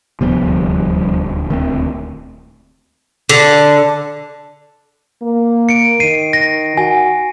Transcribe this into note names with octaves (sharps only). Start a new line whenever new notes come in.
D#1 D2 C3 F3 G3 B3
D#3 A3 C4
D3
A#3
C#7 D7
D#3 C7 D#7
A#6
F#4 G#5